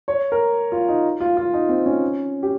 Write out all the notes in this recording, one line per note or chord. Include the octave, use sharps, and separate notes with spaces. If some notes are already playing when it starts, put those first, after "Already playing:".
C#5
A#4
F4
D#4
F4
F4
D#4
C4
C#4
G4